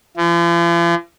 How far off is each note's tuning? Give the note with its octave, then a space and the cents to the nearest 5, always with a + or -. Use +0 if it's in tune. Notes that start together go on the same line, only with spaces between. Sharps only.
F3 -45